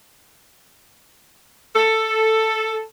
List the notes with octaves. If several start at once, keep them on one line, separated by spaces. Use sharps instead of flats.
A4